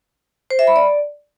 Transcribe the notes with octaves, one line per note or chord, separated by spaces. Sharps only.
C5
E5
B5
D5